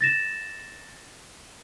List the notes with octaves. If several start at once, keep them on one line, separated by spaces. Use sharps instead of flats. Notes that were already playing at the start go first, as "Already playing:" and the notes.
A6 A#6 E7